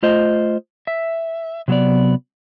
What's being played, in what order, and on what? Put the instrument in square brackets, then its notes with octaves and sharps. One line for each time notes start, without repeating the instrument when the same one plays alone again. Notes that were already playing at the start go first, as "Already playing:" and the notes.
[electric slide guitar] A3 F4 C5 D#5
E5
C3 F#3 B3 D5